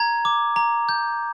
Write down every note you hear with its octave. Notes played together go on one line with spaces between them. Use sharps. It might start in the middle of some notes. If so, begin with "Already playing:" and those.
Already playing: A#5 G#6
D6
A#5
G6